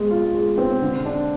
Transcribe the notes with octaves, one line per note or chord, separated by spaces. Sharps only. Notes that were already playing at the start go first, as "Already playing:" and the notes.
Already playing: G#3 C4
F4
G#3
C4
D3
D4